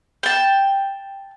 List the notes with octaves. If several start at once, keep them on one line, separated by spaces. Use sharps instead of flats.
G5 A5